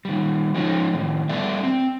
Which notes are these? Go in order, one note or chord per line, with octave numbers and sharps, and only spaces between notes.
D#3 G3
F3 G#3 C#4 D#4
A2 D#3
G3 B3 A4 D5 E5
C4